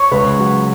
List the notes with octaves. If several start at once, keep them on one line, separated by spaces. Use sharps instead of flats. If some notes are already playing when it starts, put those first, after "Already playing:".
Already playing: C#5
C#2 B4
F#3